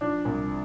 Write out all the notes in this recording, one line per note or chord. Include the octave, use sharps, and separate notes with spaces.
F3 D4
C2